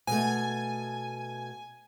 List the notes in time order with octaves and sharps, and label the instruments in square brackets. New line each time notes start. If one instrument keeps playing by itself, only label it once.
[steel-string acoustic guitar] B2 A3 [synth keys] G#5